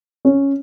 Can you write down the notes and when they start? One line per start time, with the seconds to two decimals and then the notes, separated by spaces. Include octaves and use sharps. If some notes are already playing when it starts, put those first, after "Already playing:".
0.25 C#4